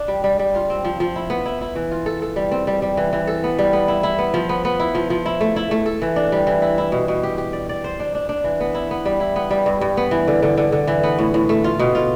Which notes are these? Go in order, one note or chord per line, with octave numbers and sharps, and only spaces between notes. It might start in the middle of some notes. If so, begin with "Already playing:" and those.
Already playing: D4
G3
G3
G3
F4
C4
F3
F3
E4
B3
E4
E4
E3
F4
A4
A4
G3
C4
G3
G3
E3
E3
A4
B3
G3
B3
E4
E4
B3
F3
B3
B3
E4
F3
F3
E4
A3
E4
A3
A4
E3
D4
G3
E3
E4
E4
B2
B2
G4
G4
D5
D5
C5
D4
D4
D4
E3
B3
E4
B3
G3
E4
B3
G3
G2
G2
B3
E3
D3
D3
D3
D3
E3
B3
A2
A2
A3
F4
B2
F4